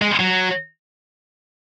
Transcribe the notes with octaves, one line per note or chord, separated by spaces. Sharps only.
G#3
F#3